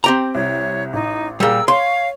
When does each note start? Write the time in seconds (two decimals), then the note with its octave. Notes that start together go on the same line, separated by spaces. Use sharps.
0.04 C4 G4 A#5
0.35 C2 C#5
0.93 A1 D#4
1.40 A#2 G3 G#4 A#4 E6
1.68 C#5 F5 C6